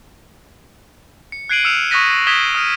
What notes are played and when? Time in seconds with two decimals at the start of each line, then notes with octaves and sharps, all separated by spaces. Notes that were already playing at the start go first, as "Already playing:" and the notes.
1.32 C#7
1.49 F#6 G#6 C7 D7 D#7 F#7
1.65 E6 F6 C#7 E7 F7
1.90 C#6 D#6 F#6 A#6 B6 D#7
2.27 D#6 G#6 B6 E7 G7
2.55 D#6 F6 D#7